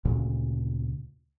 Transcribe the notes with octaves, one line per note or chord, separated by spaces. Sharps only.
D2 A#2 C#3